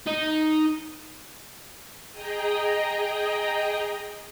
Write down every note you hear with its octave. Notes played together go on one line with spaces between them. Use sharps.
D#4
G#4 D#5 G5 A#5